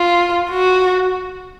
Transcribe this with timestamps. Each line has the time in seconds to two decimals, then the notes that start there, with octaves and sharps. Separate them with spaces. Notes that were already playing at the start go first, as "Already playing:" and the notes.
Already playing: F4
0.50 F#4